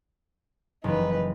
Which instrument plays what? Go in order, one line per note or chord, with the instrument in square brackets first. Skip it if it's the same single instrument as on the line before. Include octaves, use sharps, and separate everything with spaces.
[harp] F#1 E3 [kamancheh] D#4 B4